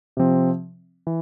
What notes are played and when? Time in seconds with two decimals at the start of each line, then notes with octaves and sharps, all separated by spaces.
0.17 C3 F3 C4
1.07 E3